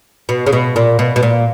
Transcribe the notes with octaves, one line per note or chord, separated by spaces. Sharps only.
B2
C#3
B2
A#2
B2
B2
A#2